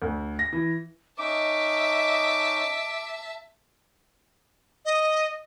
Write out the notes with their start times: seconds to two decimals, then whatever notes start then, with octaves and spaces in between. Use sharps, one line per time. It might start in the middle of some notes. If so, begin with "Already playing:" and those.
0.02 D2
0.39 A#6
0.53 E3
1.19 C#4 D#4 D#5 E5 A5 D6
4.85 D#5